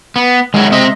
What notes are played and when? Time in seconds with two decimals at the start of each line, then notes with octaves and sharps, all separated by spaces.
0.16 B3
0.54 D#3 F#3 G#3 E4
0.72 C3 C4 D#5 E5